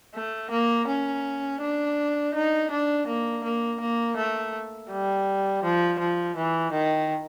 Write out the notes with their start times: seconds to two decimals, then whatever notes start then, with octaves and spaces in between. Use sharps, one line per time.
0.15 A3
0.51 A#3
0.88 C#4
1.61 D4
2.34 D#4
2.71 D4
3.07 A#3
3.44 A#3
3.80 A#3
4.17 A3
4.90 G3
5.63 F3
5.99 F3
6.37 E3
6.72 D#3